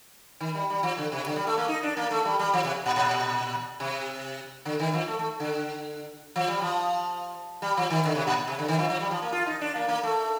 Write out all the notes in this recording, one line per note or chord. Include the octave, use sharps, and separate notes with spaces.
D#3
G3
G3
F3
D3
C3
D3
G3
A3
A#3
D#4
D4
A#3
A3
G3
G3
F3
C3
A#2
A#2
C3
D3
D#3
F3
A3
A3
D3
F3
G3
F3
G3
F3
D#3
D3
C3
A#2
C3
D3
D#3
F3
F3
G3
F3
A#3
F4
D#4
D4
A#3
A#3
A3